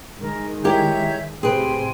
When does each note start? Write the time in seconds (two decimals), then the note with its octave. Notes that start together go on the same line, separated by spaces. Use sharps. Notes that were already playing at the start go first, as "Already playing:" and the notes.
0.20 D#3 G#3 A#4
0.64 E4 G4 A#4 C#5 E5 G6
1.43 A2 C3 G#4 B4 G5 G#5 C6